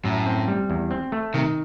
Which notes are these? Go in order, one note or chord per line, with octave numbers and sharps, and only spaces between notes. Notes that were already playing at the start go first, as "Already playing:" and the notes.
F#2 A2
C4
G3
E2
C4
A3
C3 D#3